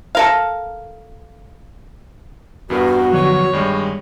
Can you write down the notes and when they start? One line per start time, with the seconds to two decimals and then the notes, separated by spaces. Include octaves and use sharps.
0.15 A4 A#4 F5
2.70 E2 G2 B3 F#4 A#4
3.12 D3 F3 F#3 C#5
3.53 G2 D#3 G3 G#3